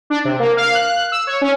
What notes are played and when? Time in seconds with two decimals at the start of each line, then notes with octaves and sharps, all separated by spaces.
0.10 D4
0.25 C3
0.40 A#3
0.57 F5
0.75 F#6
0.88 F#6
1.12 E6
1.27 C#5
1.41 C#4